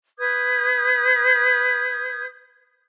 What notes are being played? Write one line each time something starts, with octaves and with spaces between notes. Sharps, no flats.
B4 D#6 G6 G#6